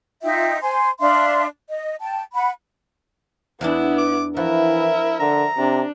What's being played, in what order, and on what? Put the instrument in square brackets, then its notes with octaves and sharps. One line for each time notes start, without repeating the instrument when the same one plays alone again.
[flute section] D#4 F4 E5 G5
C5 G#5 C6
D4 E5 F5 C6
D#5
G5 A5
F#5 B5
[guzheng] E2 E3 D4 [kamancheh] B3 E4
[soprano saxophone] D6
[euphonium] E3 [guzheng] F3 F#4 [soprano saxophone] E4 [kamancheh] A#4 E5
[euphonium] D3 [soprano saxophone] A#5
[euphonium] C3 [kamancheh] D4